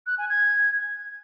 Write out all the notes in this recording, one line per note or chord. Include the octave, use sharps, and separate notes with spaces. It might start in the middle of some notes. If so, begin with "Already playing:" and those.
F#6
G#5
G#6